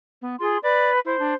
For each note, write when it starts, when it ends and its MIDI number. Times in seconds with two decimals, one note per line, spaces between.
0.22 0.36 59
0.40 0.57 65
0.40 0.57 68
0.40 0.57 84
0.63 0.99 71
0.63 0.90 74
1.05 1.18 64
1.05 1.34 72
1.19 1.34 62